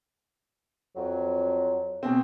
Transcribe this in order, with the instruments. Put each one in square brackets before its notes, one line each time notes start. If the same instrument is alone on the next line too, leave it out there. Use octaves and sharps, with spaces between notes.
[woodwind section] F2 F#3
[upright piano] B2 C4